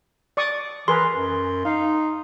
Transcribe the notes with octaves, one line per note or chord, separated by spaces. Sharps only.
D5 C#6 D#6
E3 G#4 A#4 B4 C6
F#2
D#4 F5